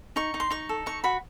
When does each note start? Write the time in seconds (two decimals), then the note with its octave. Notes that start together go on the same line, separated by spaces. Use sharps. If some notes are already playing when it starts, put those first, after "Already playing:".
0.16 D#4 C#6
0.34 D#4
0.40 C6
0.50 D#4 C#6
0.69 A4
0.86 D#4 C#6
1.04 F#4 B5